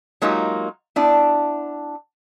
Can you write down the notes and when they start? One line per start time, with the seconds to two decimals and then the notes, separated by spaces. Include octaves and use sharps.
0.22 F#3 G#3 A#3 D#4 F4 G4
0.96 B3 D4 E4